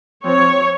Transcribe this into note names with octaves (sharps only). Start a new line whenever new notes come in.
F3 C4 C#5